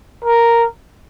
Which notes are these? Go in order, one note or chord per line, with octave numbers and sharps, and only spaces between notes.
A#4